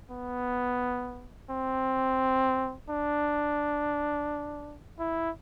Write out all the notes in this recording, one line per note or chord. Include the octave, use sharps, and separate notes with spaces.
B3
C4
D4
E4